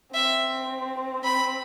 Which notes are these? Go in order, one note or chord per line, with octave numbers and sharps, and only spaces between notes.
C4 E5
C4 B5